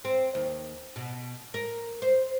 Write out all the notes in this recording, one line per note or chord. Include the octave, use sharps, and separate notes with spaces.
C4
D#2
B2
A#4
C5